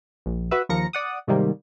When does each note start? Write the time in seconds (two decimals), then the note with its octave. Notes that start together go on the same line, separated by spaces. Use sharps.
0.26 A#1
0.51 F#4 B4 E5
0.69 D#2 F3 A#4 A#6 C#7
0.93 D5 F#5 D#6
1.27 G#2 C3 D#3 G3 A#3